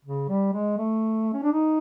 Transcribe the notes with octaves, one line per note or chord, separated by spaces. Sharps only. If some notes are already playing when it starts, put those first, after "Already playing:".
C#3
G3
G#3
A3
C#4
D4
D#4